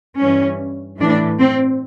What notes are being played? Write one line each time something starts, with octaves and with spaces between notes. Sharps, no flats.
G2 E3 C#4
A2 E3 D4
C4